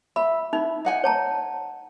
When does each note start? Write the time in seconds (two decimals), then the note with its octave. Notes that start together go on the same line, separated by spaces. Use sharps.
0.16 E5 B5
0.53 D#4 E4
0.85 D#4 F#5 G#5
1.04 C#5 A5 A#5